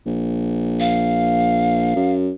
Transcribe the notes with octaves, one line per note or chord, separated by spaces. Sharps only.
A#1
F5
F#2